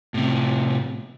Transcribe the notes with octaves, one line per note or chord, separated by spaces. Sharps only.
A2 C3